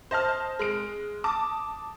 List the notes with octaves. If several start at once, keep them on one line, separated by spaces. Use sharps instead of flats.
C5 D#5 A5 F6
G#3 F6 D7
A5 D6 D#6